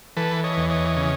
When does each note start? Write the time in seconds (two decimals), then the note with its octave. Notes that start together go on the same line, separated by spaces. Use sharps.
0.17 E3 A4 B4
0.44 C#5 D#5
0.57 E2
0.70 C#5 D#5
0.97 C#3